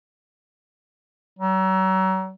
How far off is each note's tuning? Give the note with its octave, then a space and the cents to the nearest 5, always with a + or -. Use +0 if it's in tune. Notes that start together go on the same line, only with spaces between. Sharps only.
F#3 +35